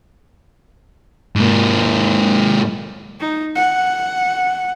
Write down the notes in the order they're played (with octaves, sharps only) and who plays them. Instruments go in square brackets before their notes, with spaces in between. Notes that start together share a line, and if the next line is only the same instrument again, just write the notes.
[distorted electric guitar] G#2 A#3
[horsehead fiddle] D#4
F#5